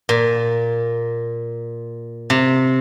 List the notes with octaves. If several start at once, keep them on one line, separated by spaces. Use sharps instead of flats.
A#2
C3